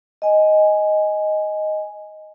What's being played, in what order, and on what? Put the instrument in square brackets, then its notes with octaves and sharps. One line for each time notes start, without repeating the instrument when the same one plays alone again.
[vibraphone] D#5 G#5